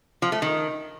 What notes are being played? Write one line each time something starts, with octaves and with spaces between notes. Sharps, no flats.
F3
A3
D#3